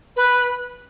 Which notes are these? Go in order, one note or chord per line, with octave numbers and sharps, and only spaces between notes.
B4